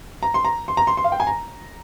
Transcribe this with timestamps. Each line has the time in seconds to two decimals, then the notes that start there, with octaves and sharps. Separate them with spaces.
0.23 A#5
0.34 C6
0.45 A#5
0.68 C6
0.77 A#5
0.87 C6
0.97 C6
1.04 F5
1.12 G5
1.20 G#5
1.27 A#5